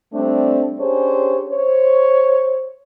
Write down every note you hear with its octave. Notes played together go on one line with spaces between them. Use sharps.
G3 A3 C4 D4
C#4 D4 G4 G#4 C5 C#5
C5 C#5